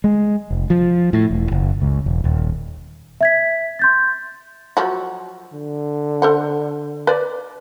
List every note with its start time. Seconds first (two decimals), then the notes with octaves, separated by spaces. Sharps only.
0.04 G#3
0.51 F1
0.70 F3
1.13 A2
1.30 E1
1.52 F#1
1.82 C#2
2.06 E1
2.24 D#1
3.21 E5 G#6 B6
3.79 C6 G6 A6
4.77 F3 F#3 F#4
5.54 D3
6.22 A4 C5 F#5
7.07 B4 D5